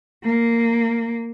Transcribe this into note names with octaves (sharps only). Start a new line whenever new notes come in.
A#3